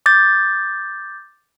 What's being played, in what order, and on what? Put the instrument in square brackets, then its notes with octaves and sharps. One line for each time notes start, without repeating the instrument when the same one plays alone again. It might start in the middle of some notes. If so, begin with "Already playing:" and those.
[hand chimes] D6 G6 A6